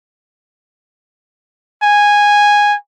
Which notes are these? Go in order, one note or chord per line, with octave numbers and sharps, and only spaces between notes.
G#5